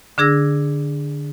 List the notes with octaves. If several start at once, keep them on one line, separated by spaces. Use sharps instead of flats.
D3 D4 G#4 E6 A#6